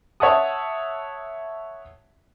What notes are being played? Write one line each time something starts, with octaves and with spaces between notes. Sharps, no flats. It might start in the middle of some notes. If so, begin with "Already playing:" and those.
C#5 E5 F#5 A5 D#6